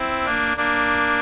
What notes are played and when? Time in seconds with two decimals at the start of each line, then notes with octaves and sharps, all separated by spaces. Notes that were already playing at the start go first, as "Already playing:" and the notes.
Already playing: C4 E4
0.25 A#3 D4
0.57 A#3 D4